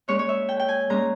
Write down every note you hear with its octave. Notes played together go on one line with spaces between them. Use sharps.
A#2 G#3 C#4 C#5
C#5
E5
G5
G5
G#5
A#2 G#3 C#4 A#5